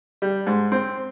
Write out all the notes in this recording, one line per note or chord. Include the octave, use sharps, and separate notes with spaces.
G3
G#2
C4